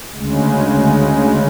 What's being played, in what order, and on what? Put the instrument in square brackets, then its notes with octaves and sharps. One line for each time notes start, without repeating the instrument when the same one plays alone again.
[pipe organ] D2 C#3 G#3